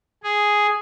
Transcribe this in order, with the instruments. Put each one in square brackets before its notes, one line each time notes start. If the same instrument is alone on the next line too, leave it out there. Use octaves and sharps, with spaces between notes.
[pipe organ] G#4